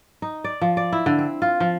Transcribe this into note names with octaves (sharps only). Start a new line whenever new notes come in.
D#4
D5
F3
D5
E4
D3
C4
F4
F3